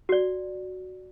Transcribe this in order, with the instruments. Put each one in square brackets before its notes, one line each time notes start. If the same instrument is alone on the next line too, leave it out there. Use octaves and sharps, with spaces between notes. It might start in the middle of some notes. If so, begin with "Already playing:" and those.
[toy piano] F#4 D5